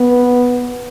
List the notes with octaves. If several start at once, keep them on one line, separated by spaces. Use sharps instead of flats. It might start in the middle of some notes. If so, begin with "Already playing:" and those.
Already playing: B3